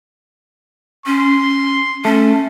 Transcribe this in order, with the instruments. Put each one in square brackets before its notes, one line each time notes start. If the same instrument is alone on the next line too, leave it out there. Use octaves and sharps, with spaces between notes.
[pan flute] C#4 [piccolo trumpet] C6
[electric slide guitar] A3 [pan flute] C#4